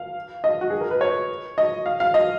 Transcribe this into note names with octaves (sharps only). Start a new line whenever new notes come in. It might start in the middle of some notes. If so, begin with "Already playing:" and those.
Already playing: F5
D#5
F#4
G#4
A#4
B4
C#5
D#5
F5
F5
D#5